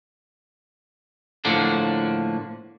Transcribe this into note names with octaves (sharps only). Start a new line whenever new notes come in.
A2 D3 F3 A#3 D4